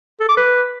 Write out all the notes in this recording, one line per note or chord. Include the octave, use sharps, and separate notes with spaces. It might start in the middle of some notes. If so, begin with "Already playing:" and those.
A4
D6
B4